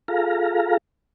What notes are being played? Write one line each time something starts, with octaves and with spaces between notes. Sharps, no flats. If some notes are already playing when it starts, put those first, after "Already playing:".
F4 G#4 A4 F5 A#5